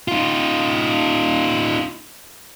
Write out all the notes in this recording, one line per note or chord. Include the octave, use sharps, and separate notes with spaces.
D#4 F4